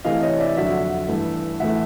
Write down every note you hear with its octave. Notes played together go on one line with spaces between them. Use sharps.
C3 E3 A3 D#5 F5
C#5 D#5
D5 E5
F2 D3 F#3 E5 F#5
G2 E3 A3
A2 E3 A3 E5 F#5